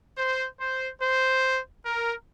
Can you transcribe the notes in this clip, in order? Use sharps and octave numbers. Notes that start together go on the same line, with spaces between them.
C5
C5
C5
A#4